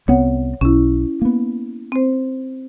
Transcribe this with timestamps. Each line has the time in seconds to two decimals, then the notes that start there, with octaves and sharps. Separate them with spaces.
0.08 C2 B3 C4 C#5 F#5
0.61 B1 C#4 E4
1.22 A#3 B3
1.92 C4 C5